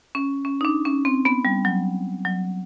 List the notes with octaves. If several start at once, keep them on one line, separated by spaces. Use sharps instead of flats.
C#4
C#4
D#4
D4
C#4
C4
B3
G3
F#3
F#3